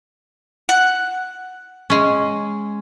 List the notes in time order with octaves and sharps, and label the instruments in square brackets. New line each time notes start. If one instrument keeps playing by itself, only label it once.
[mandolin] F#5
[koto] G#3 C#4